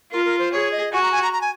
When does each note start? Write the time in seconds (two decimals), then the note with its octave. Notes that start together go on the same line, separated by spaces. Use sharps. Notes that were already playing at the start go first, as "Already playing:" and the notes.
0.12 F4 A#4
0.25 A#4
0.38 C5
0.52 G#4 C#5
0.71 D#5
0.92 F#4 G#5
1.02 A#5
1.11 G#5
1.22 A#5
1.33 A#5
1.41 G#5